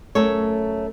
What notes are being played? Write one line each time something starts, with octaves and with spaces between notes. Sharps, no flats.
F#2 A3 A4 C#5